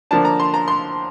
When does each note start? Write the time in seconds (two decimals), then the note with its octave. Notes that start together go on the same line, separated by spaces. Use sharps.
0.11 D3 F3 A#3 D4 A5
0.25 A#5
0.40 C6
0.54 A#5
0.68 C6